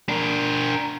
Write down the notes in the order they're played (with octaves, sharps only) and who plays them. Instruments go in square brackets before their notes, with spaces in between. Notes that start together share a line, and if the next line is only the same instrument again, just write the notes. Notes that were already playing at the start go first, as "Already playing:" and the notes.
[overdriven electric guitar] D4 A#4